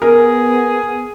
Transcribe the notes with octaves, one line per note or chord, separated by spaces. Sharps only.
B3 G#4 A#4